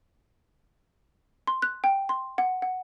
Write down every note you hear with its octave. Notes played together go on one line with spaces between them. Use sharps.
C6
F#6
G5
C6
F#5
F#5